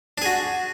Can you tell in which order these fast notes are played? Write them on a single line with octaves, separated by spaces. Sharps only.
D4 G#4 F#4